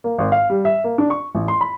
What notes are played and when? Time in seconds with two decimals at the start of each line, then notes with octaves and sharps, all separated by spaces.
0.04 A#3
0.18 G#1
0.32 F5
0.50 G3
0.65 E5
0.84 A#3
0.98 D4
1.10 C#6
1.35 A1
1.48 C6
1.61 B5